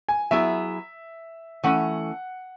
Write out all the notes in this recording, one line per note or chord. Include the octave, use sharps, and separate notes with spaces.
G#5
F#3 B3 E4 G#4 E5
E3 A3 C#4 F#5